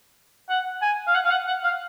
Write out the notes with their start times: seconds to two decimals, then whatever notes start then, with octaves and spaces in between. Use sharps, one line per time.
0.49 F#5
0.82 G#5
1.07 F5
1.15 F#5
1.24 F5
1.30 F#5
1.47 F#5
1.64 F5